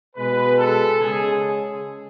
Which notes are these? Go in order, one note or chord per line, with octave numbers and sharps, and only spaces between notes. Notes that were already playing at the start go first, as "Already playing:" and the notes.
B2 G#3 B4
A4
C#3 G#3 G#4